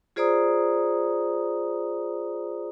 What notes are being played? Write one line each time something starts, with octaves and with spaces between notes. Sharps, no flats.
F4 G#4 C5 D5 A#5 D#6